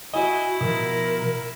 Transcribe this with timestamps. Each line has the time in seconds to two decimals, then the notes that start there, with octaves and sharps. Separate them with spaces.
0.14 E4 F#4 D#5 G#5
0.61 B2 F3 A#4